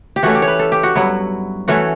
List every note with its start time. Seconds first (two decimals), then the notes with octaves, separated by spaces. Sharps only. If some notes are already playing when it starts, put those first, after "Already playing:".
0.16 G4
0.23 E3 A3 C#4 F#4
0.35 G4
0.42 C#5
0.48 B4
0.59 A4
0.72 G4
0.83 F#4
0.95 G2 F#3 B3 E4
1.68 E3 A3 C#4 F#4